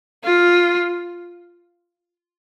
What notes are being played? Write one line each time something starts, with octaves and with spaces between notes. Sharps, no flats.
F4